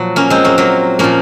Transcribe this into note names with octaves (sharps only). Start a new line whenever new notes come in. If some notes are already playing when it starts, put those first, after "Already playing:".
Already playing: A#2 F3 F#3
A#3 C#4
G#3 C4
F#3 A#3
F#3 A#3
A#2 F3 A#3 C#4